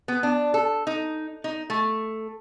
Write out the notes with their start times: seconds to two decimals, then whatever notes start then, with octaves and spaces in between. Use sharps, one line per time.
0.08 B3
0.23 D4
0.54 A4
0.87 D#4
1.44 D#4
1.70 A3